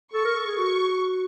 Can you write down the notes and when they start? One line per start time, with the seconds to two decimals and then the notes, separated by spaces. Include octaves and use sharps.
0.14 A4 C#6
0.25 A#4
0.36 A4
0.47 G#4
0.58 F#4 C#6